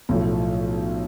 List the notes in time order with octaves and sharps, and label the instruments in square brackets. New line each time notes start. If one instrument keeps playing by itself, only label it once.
[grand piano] B1 A2 F3